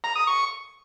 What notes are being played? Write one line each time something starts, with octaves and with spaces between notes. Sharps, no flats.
A#5
D#6
C#6